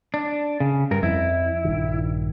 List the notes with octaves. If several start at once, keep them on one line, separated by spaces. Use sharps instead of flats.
D4
C#3
G2 A#4
F2 E4
A#1 G2 D#3